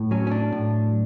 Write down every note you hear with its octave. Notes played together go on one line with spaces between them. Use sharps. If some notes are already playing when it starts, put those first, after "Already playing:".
Already playing: A2
F#3 C#4
C#4
D4
A2